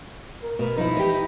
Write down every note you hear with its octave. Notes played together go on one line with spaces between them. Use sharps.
A#4
B2 A#4
F3 D#4 E4
E3 G4 D#5